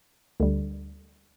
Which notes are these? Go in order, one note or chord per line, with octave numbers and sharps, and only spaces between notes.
D2 D3 G3